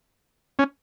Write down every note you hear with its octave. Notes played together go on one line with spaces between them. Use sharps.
C#4